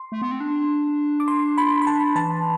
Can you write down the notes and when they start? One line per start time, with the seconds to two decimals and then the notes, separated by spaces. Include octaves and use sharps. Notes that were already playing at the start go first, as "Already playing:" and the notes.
Already playing: C6
0.12 A3
0.22 B3
0.31 C4
0.40 D4
1.20 D6
1.28 C6
1.58 B5
1.82 B5
1.87 A5
2.16 E3 A5